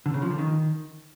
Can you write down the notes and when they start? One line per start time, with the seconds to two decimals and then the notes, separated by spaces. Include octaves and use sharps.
0.06 D3
0.14 C#3
0.22 F3
0.30 D3
0.38 D#3